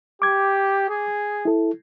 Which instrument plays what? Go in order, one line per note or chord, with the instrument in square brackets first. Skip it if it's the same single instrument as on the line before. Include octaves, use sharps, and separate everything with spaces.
[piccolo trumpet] G4 [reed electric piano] D6 G#6
[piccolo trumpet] G#4
[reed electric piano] E4 A4